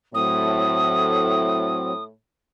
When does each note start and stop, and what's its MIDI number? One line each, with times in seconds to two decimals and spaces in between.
0.14 2.12 45
0.14 1.92 54
0.14 1.92 60
0.14 2.03 87